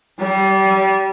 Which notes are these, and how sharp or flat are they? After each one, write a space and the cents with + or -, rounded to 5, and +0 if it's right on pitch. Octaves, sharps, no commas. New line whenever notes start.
G3 -25